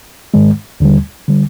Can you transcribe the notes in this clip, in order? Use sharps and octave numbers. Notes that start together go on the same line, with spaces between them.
G#2 D#3 G#3
D#2 D3 G3
D3 G3